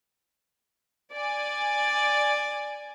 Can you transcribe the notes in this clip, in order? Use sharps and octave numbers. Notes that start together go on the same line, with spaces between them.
D5 G#5